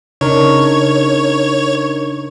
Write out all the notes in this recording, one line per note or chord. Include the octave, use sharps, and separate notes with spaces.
C#3 D4 D#4 A#4 C#5